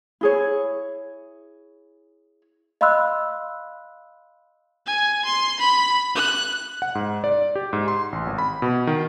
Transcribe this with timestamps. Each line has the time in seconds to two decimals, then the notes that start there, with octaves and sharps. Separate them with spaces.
0.21 E4 G#4 C#5
2.81 D#5 F5 B5 C6 E6 F#6
4.87 G#5
5.25 C6
5.60 B5
6.15 F#6
6.82 F#5
6.95 G#2
7.24 D5
7.56 G4
7.73 G#2
7.88 C6
8.12 A1
8.27 G#1
8.38 B5
8.62 B2
8.87 D#3